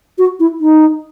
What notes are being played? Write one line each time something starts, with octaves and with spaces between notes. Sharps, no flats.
F#4
E4
D#4